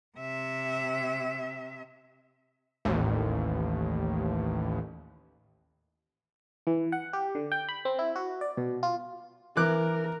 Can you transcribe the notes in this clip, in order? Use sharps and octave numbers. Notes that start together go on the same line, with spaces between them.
C3 E5
A1 D#2
E3
F#5
G4
D3
G5
B5
C4
E4
F#4
D5
B2
F4
E3 A#4 D6 F#6